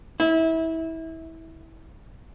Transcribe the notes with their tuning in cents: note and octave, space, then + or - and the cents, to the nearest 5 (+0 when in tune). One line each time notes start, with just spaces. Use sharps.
E4 -25